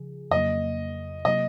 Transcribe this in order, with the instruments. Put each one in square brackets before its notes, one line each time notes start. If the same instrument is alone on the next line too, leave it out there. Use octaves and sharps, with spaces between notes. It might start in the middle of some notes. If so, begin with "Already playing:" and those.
Already playing: [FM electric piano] C#3 F3 G#4
[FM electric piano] F2 C#3 F#3 A#3 [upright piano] D#5
[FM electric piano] C3 F#3 A#3 [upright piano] D#5